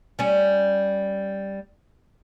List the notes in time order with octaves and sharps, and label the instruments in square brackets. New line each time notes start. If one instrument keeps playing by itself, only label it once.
[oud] G3 C#4